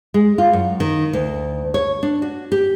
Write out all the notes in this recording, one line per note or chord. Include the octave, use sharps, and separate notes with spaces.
G#3
F4
F#2
D#3
D2
C#5
D4
F#4
G4